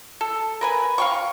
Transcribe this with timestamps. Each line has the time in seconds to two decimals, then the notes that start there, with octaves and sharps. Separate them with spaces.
0.21 A4
0.61 A#4 B4 G#5
0.98 F5 G5 C#6